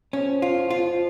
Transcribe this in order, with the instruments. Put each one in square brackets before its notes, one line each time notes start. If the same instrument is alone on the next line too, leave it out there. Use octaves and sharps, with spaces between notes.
[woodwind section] F2 F3 [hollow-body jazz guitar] C#4
[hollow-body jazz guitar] F4
F4